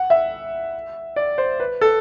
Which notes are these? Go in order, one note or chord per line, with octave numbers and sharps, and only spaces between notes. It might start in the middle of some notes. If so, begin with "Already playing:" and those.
Already playing: F#5
E5
D5
C5
B4
A4